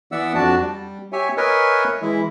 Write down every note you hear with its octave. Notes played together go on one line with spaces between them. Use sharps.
E3 B3 D5 E5 F#5 E6
F2 D4 F#4 D5 A5
G3
G4 C#5 E5 G#5
A#4 B4 C#5 D#5 E5 G#5
E3 G#3 E4 E5